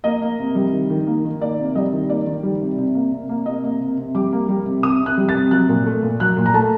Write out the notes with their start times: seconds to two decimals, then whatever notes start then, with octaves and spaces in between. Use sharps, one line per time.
0.04 A#3 D#5
0.21 A#3
0.39 C3
0.55 G3
0.73 D#3
0.90 D#3
1.07 A#3
1.24 D#3
1.41 A#3 D5
1.58 C3
1.75 G3 D#5
1.93 D#3
2.09 A#3 D5
2.27 D#3
2.43 G3
2.61 C3
2.78 C3
2.94 A#3
3.12 C3
3.29 A#3
3.46 C3 D#5
3.64 A#3
3.80 C3
3.97 C3
4.15 G3 D6
4.32 A#3
4.49 G3
4.66 C3
4.83 C3 D#6
5.01 C3
5.06 F#6
5.17 G3
5.29 A6
5.35 C3
5.51 F#3 F#6
5.69 A#2
5.86 A3
6.03 A#2
6.20 F#3 F#6
6.37 A#2
6.46 A#5
6.54 A3 A5